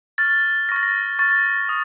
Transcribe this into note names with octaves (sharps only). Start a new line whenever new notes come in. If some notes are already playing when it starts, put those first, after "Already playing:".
C#6 F6 A6
C#6 F6 A6 A#6
A#6
C#6 F6 A6
D#6